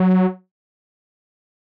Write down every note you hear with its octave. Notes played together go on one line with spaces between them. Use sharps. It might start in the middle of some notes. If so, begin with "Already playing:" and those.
Already playing: F#3